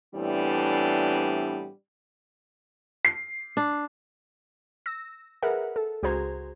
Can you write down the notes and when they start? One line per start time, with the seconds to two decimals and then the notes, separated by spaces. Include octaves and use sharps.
0.14 A2 E3 G3 B3 C4 D4
3.05 C7
3.57 D4
4.86 E6 A#6
5.43 G#4 A#4 B4 E5 F#5
5.76 A4
6.03 C#2 F#4 G#4 C5 A#5 G#6